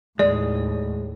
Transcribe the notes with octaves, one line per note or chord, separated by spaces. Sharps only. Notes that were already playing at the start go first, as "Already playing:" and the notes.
D#2 A2 G#3 D5